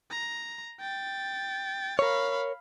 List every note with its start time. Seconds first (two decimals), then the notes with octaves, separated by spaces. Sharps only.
0.11 A#5
0.80 G5 A6
1.99 A#4 C#5 F5 B5